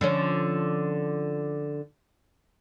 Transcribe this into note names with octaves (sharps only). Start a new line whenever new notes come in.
D3 F3 C#4